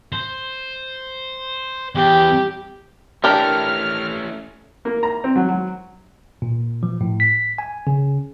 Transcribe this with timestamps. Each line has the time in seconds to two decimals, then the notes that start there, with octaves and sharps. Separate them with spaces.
0.12 C5
1.95 E2 G4
3.24 A3 C#4 D4 E4 G4 A#4 F6
4.85 A#3
5.03 A#5
5.24 C4
5.36 F#3
5.49 F#3
6.42 A#2
6.83 F3
7.01 A2
7.20 B6
7.58 G#5
7.87 C#3